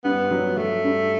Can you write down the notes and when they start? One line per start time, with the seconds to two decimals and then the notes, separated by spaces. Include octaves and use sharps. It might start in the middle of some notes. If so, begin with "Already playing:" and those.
0.04 G2 B3
0.31 F#3
0.57 F#3 A3
0.84 G2